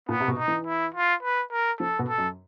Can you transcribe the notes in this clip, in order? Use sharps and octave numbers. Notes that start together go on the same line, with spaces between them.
A#2 B3
C3
B2
D#4
E3
E4
F4
B4
A#4
F3 A4
B2
A4
F#2